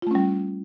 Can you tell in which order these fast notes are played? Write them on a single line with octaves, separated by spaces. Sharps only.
F4 A3 C#4 G3